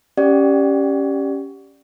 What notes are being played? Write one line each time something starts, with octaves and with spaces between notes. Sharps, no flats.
C#4 G4 D5 F#5